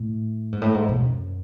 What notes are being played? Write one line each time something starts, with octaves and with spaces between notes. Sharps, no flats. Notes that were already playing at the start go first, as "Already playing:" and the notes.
Already playing: A2
G#2
A2
G#2
B2
F#2